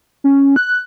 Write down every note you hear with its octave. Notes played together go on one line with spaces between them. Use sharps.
C#4
F#6